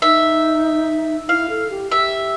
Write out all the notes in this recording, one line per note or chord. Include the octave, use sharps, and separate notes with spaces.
D#4 E5
E4 F5
A4
G4
G4 E5